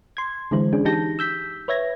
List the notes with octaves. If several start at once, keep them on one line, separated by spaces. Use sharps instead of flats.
C6 G#6
D3 E3 G#3 E4 C5
C#4 D4 G#4
E3 D#4 G4 A5 G6 A#6
E6 G6 B6
B4 C#5 E5 G#6 A#6